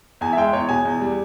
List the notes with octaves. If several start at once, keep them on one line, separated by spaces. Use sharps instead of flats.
E2 G#5
E5
G#3 G5
E2 C#5
B2 G#5
E2
G3